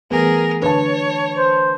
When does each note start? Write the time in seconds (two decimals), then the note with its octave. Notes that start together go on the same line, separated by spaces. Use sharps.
0.11 E3 G3 A3 B3 G#4 A#4
0.62 D3 D4 B4 C#5 A5
1.37 C5